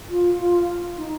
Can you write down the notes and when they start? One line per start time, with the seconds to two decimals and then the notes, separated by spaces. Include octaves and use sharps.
0.09 F4
0.38 F4
0.97 D#4